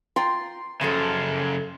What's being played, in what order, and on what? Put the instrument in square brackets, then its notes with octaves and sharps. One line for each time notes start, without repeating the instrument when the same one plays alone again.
[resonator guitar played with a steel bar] F4 G5 A#5 [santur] C6
[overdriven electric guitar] F#2 C#3 [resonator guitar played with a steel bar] F3 F#3 A4